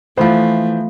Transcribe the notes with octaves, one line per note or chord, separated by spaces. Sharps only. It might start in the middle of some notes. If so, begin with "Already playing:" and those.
E3 F3 A3 B3 C5